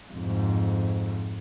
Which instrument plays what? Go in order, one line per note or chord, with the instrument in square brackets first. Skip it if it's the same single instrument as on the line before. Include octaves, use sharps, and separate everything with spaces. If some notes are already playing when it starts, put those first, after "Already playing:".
[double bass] F2 G#2